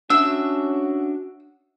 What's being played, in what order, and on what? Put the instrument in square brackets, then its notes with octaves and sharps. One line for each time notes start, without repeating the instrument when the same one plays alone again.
[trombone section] C#4 F#4 [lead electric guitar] D4 E5 [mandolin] E6